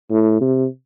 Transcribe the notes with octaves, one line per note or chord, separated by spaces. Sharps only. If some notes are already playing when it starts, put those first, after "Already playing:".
A2
C3